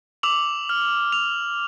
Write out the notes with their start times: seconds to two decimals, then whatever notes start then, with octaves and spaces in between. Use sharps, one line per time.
0.23 D6 E6 F7 F#7
0.69 F6
1.12 F7